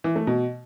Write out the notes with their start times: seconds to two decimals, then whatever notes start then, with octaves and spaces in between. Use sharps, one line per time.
0.04 E3
0.16 A3
0.27 B2